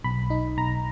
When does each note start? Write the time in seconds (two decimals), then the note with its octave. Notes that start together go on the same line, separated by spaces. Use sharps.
0.04 B1 B5
0.30 D#4
0.58 B1 A#5